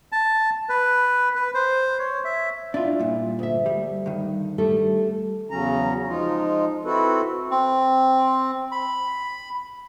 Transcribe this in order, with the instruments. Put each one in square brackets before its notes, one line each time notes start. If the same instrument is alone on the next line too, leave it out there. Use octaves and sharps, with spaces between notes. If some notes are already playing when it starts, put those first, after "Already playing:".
[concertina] A5
B4
B4
C5
C#5
E5
[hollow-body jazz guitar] D4 F4 [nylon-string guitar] E4
[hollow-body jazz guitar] G2 A#2
[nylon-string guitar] D2 E5
[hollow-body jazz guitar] G3
G2 D#3
[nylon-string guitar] G3 A3 A4
[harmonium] E2 C#3 F#3 C#4 A#5
F3 G#3 D#4 F4
C4 E4 F#4 A4 B4
[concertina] C4
B5